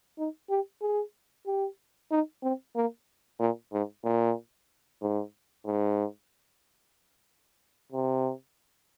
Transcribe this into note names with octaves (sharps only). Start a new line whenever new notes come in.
D#4
G4
G#4
G4
D#4
C4
A#3
A#2
G#2
A#2
G#2
G#2
C3